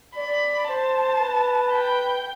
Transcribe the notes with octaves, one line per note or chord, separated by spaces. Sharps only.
D5 B5
C5 A5
B4
G5